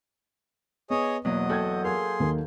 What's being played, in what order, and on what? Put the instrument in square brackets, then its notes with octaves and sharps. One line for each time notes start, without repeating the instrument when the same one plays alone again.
[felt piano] B3 [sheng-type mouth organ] G#4 C#5 D#5
[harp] E2 F#3 A#3 [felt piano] B2 [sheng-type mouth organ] D#5
[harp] F#4 A4 [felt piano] G5 G6 G#6
[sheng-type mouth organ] G#4 C6 [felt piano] A#4 [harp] F5
[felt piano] D#2 D#3 A#4